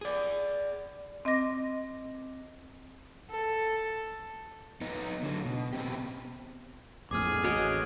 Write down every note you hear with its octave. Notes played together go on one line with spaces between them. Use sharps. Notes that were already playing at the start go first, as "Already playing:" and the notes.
G#4 D5
C4 D#5 D6 A#6
A4
B3 D#4
D3 F#3
B2
B3 C4 G4
A#1 F2 A2 G#4 D6 F6
A1 F#4 C#5 D#5 G#6 D7